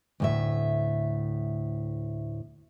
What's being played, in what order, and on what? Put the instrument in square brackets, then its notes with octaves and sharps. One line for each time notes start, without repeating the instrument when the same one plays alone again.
[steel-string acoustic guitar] D2 A2 E5